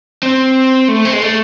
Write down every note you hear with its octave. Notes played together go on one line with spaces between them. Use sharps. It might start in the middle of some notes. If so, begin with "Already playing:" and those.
C4
A3
C4
G#3
A3